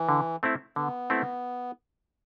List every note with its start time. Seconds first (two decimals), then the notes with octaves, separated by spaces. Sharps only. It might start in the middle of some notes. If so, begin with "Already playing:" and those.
Already playing: E3
0.09 D3
0.43 A3 C4 E4
0.76 D3 B3
1.10 A3 C4 E4